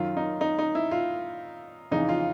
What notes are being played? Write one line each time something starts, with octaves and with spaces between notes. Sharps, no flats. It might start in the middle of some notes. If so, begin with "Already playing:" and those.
Already playing: F#2 D#3 F4
D#4
D#4
D#4
E4
F4
F2 C#3 E3 D#4
F4